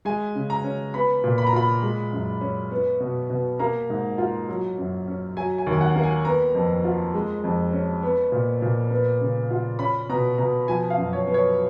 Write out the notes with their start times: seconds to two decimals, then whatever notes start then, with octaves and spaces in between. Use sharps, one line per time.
0.05 G#3 G#5
0.35 C#3
0.50 A#5
0.64 C#4
0.94 B3 B5
1.24 A#2
1.38 B5
1.46 A#5
1.53 F4 B5
1.83 G#3
2.13 F#2
2.41 C#4
2.71 B3
3.00 B2
3.30 B2
3.59 A#3 A#5
3.90 G#2
4.18 F4
4.49 F#3
4.78 F#2
5.08 C#4
5.37 F#3 G#5
5.58 G#5
5.66 D#2
5.73 G#5
5.81 F#5
5.95 A#3
6.03 G#5
6.25 B3 A#5
6.55 F2
6.84 F4
7.14 G#3
7.44 F2
7.73 C#4
8.02 B3
8.32 A#2
8.62 A#2
8.91 B3
9.21 C#3
9.50 F4
9.79 C#4 B5
10.09 B2 A#5
10.38 B2 A#5
10.68 F3 G#5
10.90 F5
10.97 F#2
11.13 C#5
11.27 B3
11.34 C#5